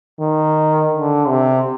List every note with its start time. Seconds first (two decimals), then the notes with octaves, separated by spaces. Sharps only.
0.19 D#3
0.92 D3
1.28 C3